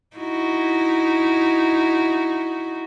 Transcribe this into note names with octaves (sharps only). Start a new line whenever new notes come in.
D#4 E4 F#4